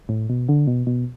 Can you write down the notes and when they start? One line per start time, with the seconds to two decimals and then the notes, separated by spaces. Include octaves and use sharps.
0.09 A2
0.29 B2
0.49 D3
0.67 B2
0.87 B2